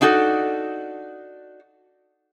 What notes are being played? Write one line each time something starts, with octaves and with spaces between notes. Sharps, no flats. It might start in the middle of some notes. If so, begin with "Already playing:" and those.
D4 D#4 F#4 G#4 A4